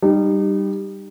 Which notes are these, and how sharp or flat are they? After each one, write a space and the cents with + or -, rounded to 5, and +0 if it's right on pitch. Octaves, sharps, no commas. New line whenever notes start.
G3 +0 D#4 -30